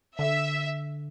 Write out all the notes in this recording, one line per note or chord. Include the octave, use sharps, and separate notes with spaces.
D3 E5